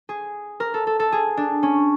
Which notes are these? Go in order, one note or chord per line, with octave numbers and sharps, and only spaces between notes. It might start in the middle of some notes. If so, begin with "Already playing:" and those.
G#4
A#4
A4
A4
A4
G#4
D4
C#4